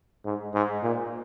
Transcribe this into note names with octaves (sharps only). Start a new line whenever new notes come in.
G#2
G#2
A#2